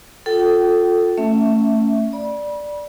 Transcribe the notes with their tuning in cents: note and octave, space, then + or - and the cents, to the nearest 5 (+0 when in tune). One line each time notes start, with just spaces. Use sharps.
F4 +25 A4 +0 G5 -40
A3 +15 C#4 +0 E5 +0
D5 +0 B5 -35